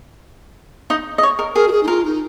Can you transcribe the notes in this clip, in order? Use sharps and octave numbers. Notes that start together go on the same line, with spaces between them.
D#4 D#5
D#5
C#5
A#4
G#4 A#4
F#4
G#4
D#4
F4 A#4
D#4